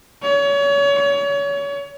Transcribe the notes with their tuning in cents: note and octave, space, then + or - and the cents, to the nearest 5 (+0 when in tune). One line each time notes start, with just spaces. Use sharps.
C#5 +30